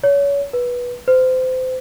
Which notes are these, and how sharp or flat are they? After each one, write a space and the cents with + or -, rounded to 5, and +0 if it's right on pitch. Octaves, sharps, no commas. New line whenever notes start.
C#5 +30
B4 -15
C5 -30